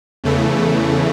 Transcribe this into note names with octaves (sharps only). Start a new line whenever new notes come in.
E2 C#3 E3 A3